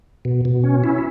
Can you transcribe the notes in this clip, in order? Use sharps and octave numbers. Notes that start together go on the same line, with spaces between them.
B2
B2
C#4
E4